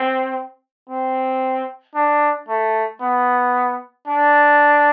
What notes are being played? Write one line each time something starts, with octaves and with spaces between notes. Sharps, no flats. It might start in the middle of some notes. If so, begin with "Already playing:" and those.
Already playing: C4
C4
D4
A3
B3
D4